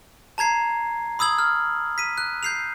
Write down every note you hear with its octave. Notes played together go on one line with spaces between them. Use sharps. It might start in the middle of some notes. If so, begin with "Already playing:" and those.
A5 A#5 G#6 C7
B5 D#6 E6 G#6 F#7
F6
B6 D#7
F#6
G6 C7 F7